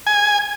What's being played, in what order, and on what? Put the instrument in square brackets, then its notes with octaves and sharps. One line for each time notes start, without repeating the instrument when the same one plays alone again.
[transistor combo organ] G#5